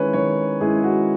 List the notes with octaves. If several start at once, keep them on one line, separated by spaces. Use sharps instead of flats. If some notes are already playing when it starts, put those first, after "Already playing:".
Already playing: D#3 G#3 C#4 E4 B4 C#5
D#3 C#5
G#3 C#4 E4 G#4
F#4